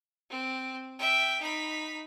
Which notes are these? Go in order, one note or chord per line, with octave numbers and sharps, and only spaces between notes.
C4
E5 G5
D#4 B5